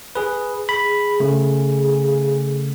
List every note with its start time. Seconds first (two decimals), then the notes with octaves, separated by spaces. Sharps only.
0.15 G#4 B4
0.69 G#4 B5
1.20 C#3 A3